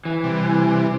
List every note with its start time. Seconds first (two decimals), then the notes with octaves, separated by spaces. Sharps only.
0.05 E3
0.24 C3 G3